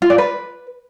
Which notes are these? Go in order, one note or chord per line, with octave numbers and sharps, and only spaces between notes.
F4
D5
B4